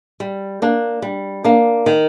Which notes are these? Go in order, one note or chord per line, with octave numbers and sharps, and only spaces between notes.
G3
A#3 D4
G3
A#3 D4
D#3